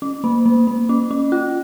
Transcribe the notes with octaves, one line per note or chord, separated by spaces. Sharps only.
C#4
A#3
A#3
A#3
C#4
C#4
F4